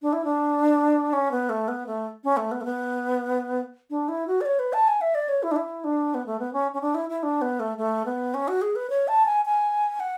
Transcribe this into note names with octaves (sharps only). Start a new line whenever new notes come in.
D4
E4
D4
C#4
B3
A3
B3
A3
C#4
A3
B3
A3
B3
D4
E4
F#4
D5
C#5
B4
A5
G#5
E5
D5
C#5
E4
D4
E4
D4
B3
A3
B3
C#4
C#4
D4
E4
E4
D4
B3
A3
A3
B3
C#4
F#4
G#4
B4
C#5
A5
G#5
G#5
F#5